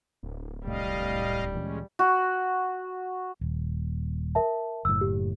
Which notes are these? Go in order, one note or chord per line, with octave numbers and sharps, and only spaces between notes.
D1
C2 A2 G3 D#5 F5
D2 A#2 E3 G#3 C#4
F#4
D#1
A#4 E5 A5
F#1 A2 E6
G4